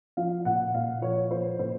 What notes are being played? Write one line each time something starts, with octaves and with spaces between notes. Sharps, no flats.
F3 F5
A#2 F#5
A#2 F5
F3 C#5
F3 C5
A#2 C5